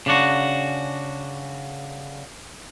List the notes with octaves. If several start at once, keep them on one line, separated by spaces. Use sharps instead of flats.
C#3 D4 F#4